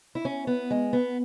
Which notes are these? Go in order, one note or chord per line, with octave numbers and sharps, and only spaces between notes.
E4
C#4
B3
G#3
B3